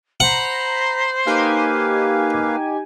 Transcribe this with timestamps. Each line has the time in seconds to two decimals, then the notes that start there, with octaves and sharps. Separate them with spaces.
0.20 C5 F#5 A#5 B5
1.26 A#3 D#4 G4 B4 F5 G#5